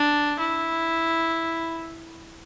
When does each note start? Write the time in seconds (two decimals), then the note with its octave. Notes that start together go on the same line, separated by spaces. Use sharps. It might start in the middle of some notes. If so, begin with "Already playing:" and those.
Already playing: D4
0.39 E4